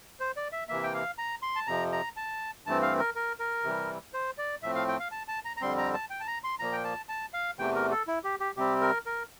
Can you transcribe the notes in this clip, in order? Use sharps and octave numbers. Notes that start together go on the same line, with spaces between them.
C5
D5
E5
C3 E3 A#3 E5
G5
F5
A#5
C6
A5
F2 C3 F3 A#5
A#5
A5
G2 E3 A3 C4 A5
F5
A#4
A#4
A#4
C3 E3 G3
C5
D5
A2 F3 A3 C4 E5
F5
G5
F5
A5
A5
A#5
A#5
F2 D3 G3 C4 C6
A#5
A5
G5
A5
A#5
C6
A#2 F3 A#3 A#5
G5
A5
A5
F5
E2 C3 E3 A3 G5
A#4
A4
E4
G4
G4
C3 G3 C4 G4
A#4
A#4